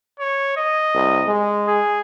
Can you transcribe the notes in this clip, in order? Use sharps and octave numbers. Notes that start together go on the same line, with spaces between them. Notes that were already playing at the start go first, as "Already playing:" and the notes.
C#5
D#5
C2
G#3
G#4